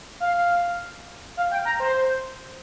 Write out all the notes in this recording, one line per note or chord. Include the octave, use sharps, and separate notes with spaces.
F5
F5
G5
A#5
C5